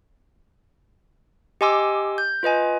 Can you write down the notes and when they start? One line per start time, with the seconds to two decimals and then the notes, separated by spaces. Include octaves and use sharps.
1.61 G4 D#5 G#5 C6 D6 E6
2.18 G6
2.43 F4 B4 D#5 G#5